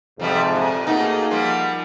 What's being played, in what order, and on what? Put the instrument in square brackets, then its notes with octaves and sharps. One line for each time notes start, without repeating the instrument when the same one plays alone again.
[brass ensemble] F2 G#2 C3 [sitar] F3 G3 B3
[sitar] A#2
[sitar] B2 A3 D#4 [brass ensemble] A#3 G#4 F#5
[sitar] F3 G3 F4